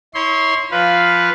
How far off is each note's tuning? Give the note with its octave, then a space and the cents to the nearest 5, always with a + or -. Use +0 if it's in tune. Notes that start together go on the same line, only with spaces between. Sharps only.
E4 -40 C#5 +0 C6 +0
F3 +0 B4 +0 F5 +0